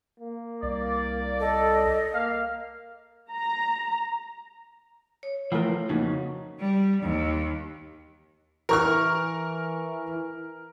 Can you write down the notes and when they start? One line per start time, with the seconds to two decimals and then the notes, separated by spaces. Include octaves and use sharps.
0.20 A#3
0.62 C2 D5
1.40 A4 D#5
2.14 A#3 F5
3.31 A#5
5.23 C#5
5.52 E3 F3 A3 A#4
5.89 F2 C#3 A#3 D#4 F#4
6.59 G3
7.02 D#2
8.69 E3 A#4 A#5 C#6 F6